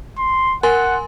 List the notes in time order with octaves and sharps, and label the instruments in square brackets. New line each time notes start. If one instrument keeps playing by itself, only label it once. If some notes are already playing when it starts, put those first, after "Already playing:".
[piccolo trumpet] C6
[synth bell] A#4 G#5 C6 [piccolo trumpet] F#5